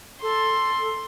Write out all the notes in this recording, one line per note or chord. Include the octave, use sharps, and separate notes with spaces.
A4 C6